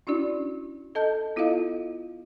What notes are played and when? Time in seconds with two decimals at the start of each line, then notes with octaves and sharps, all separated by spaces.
0.07 C#4 D4 E4 F#4 D5
0.95 A4 D#5 A5 G6
1.36 B3 E4 F4 A4 D#5 F5